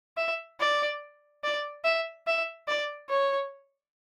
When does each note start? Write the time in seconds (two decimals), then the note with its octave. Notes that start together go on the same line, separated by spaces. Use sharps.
0.17 E5
0.60 D5
1.44 D5
1.84 E5
2.27 E5
2.68 D5
3.10 C#5